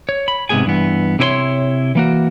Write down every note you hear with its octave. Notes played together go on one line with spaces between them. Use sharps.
C#5
B5
G#2 C3 A#3 B3 G#4 G#5
G2 E3 B3
C3 C4 E4 B4 C#5 C6
E3 A#3 F#4